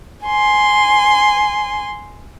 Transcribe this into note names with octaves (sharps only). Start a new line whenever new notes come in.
G#5 C6